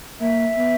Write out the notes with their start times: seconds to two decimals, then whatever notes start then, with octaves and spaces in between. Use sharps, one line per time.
0.20 A#3 E5
0.56 B3